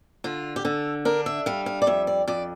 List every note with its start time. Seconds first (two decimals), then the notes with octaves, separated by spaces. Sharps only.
0.24 D3 F4
0.56 G4
0.65 D3 A4
1.05 D4 A#4
1.26 E5
1.46 G3 F5
1.66 F5
1.82 D5
1.87 F2 E5
2.07 D5
2.28 F2 D5